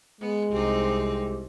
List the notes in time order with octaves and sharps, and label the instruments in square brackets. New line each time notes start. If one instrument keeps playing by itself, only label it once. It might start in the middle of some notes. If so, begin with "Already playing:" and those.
[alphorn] G#3 [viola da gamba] B3
[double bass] C2 [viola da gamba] C4 D#4 [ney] G4